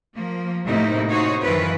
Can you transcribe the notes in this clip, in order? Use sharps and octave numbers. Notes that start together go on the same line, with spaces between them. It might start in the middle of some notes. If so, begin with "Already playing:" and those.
F3 A#3
A2 C3 A3 A#3 D#4 E4
D#4 F#4 G#4 C5 C#5
F#2 D#3 E3 E4 F4 B4